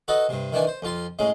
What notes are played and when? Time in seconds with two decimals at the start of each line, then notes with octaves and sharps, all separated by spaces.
0.08 F#4 A4 B4 D#5
0.29 G2 C3
0.52 D#3 E3 D4 G#5
0.67 C5
0.82 F2 F4 C6
1.19 A2 C#3 G#3